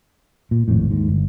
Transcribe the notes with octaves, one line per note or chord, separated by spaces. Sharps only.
A#2
G#1 F2 A2
D#2 G#2
G1